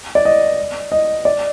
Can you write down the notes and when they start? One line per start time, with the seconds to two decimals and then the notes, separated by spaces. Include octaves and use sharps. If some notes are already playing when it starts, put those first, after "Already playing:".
0.15 D5
0.25 D#5
0.92 D#5
1.25 D5